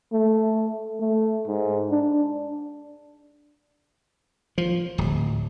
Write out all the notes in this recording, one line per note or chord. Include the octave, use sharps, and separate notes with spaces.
A3
A3
G#2
D4
F3
D1